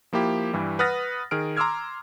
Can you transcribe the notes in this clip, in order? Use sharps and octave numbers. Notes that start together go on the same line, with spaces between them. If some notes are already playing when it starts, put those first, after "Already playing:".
F3 A#3 E4 G4
G2 E3 G3
B4 F#5 D#6 F6 A6 A#6
D#3 G#4 F6 D7
A#5 C6 D6 E6 F6 G#6